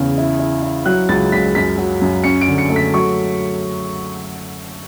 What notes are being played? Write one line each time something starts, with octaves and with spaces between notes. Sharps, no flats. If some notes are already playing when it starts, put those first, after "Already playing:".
Already playing: E2 C#3
E4
E4
E4
F#3 F#6
C#2 A6
C#2 B6
F#2 B6
F#3
F#2
C#4 C#7
D7
D3
C#7
A3
B6
F#3 C#6